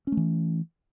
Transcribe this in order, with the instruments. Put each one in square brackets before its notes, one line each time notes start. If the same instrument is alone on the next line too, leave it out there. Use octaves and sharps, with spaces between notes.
[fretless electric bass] C#4
A3
E3